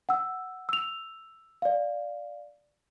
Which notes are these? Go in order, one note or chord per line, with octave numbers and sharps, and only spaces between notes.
F#5 E6
E6 F7
D5 F5